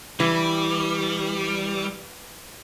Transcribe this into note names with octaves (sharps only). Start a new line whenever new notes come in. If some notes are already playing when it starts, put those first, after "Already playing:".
E3 G3